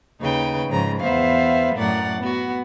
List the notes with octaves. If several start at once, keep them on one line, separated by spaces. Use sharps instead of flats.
D#2 C#3 D#4 B4 G5
G#2 C#3 F3 A#5
E2 B3 C5 E5 F5
F#2 A2 A#4 D5 F#5
B3 F#4